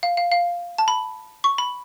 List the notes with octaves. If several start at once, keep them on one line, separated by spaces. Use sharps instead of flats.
F5
F5
F5
A5
B5
C#6
B5